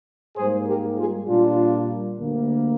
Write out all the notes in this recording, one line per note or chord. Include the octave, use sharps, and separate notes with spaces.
G#2 G3 A#3 G#4 C5
G4 A#4
F4 G#4
A#2 G3 A#3 D4 F4
D2 D3 G3 A#3